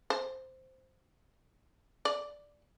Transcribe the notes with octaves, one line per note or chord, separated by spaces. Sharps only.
C5
D5